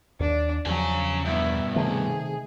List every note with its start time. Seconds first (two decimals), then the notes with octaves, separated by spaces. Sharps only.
0.20 D#2 D4
0.66 E2 C#3 F3 F#3 G#5
1.25 G2 B2 E4
1.76 C3 D#3 A3 G#4